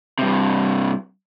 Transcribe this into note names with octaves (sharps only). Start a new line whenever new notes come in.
G2 C3